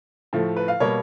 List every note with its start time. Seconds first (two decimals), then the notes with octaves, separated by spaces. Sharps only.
0.33 A2 F3 A3
0.57 B4
0.68 F5
0.80 B2 G3 A#3 C#5